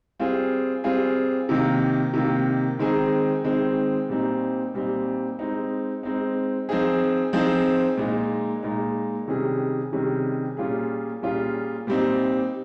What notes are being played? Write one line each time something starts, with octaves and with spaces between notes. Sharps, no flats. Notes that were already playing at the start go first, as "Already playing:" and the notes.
G3 C4 F4 G#4
G3 C4 F4 G#4
C3 D#3 A#3
C3 D#3 A#3
D#3 G#3 C4 D#4 G#4
D#3 G#3 C4 D#4 G#4
A#2 G3 C4 D#4
A#2 G3 C4 D#4
G#3 C4 D#4
G#3 C4 D#4
F3 C4 D#4 G#4
F3 C4 D#4 G#4
A#2 G#3 D#4
A#2 G#3 D#4
C3 D#3 G3 C#4 G#4
C3 D#3 G3 C#4 G#4
A#2 G3 C#4 F4 G#4
A#2 G3 C#4 F4 G#4
A#2 G3 C4 D#4